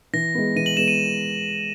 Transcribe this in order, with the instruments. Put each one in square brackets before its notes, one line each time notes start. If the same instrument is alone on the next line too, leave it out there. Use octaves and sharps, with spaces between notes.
[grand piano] E3 [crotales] A#6
[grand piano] G#3 B3
[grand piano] E3 [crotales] D#7
[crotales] F#7
[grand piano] G#3 B3 [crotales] E7
[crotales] D#7